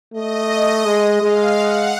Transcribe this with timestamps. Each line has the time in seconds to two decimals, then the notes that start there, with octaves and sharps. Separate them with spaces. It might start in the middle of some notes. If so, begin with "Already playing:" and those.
0.14 A3 D#5
0.86 G#3
1.22 G#3 F5
1.57 F#5